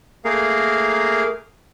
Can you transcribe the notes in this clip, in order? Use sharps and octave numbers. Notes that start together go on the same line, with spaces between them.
A3 A#3 G#4 A#4 F5